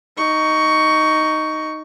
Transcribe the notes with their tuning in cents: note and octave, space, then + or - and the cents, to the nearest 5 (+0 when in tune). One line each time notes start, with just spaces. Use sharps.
D#4 +0 C#6 +15